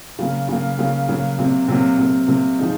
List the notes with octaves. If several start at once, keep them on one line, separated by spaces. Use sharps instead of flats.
C#3 F#3 A#3
C#3 F#3 A#3
C#3 F#3 A#3
C#3 F#3 A#3
C3 F#3 A#3
C3 F#3 A#3
C3 F#3 A#3
C3 F#3 A#3
F3 G#3 D#4